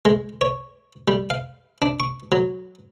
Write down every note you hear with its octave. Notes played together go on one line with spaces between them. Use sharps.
G#3
C#5
G3
F5
D4
C#6
F#3